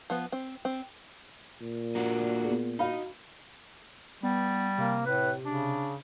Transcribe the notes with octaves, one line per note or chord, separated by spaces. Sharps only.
F3 B3
C4
C4
A#2
A#3 D4 F#4
B3 G#4
D#4 F#4 F5 B5
G3 B3
C3 A#3
A2 B4
C#3 D4